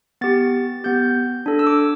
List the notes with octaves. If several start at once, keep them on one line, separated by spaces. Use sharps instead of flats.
B3 G4 A6
B3 G4 G6
D4 A4
E6
D6